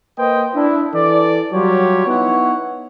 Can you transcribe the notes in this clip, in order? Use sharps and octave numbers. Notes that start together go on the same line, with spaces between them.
A#3 B4 C5 D#5 G5
D4 E4
E3 A4 D5
F#3 G3 F4 G4 C#5
B3 D#4 E4 C#5 F#5